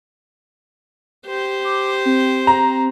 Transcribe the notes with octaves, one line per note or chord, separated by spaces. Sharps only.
G4 C5
D6
C4
A#5